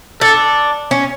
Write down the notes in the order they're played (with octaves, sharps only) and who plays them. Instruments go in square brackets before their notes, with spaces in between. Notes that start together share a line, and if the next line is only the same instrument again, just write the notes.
[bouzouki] D4 [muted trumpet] A4
[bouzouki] C#4